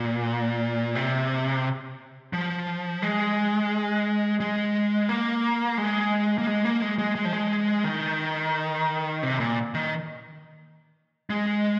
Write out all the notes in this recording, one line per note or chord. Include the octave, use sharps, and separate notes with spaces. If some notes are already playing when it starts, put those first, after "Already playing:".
Already playing: A#2
C3
F3
G#3
G#3
A#3
G#3
A#3
G#3
A#3
G#3
G#3
G#3
F3
G#3
D#3
C3
A#2
D#3
G#3